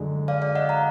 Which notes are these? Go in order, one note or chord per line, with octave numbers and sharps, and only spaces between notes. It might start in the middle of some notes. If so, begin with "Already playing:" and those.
Already playing: F#2 D3 G#3
D5 F5
D5 F5
D#5 F#5
F#5 A#5